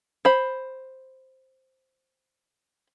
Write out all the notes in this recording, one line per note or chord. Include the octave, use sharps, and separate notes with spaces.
C5 B5